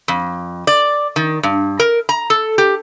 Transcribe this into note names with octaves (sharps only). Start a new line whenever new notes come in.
F2
D5
D#3
G2
A#4
A#5
A4
G4